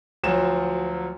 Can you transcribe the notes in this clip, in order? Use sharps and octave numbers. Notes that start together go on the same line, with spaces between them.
D2 F3 F#3 E7